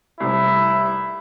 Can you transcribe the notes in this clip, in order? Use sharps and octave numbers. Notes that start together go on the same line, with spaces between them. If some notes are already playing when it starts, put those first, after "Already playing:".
F1 C2 E4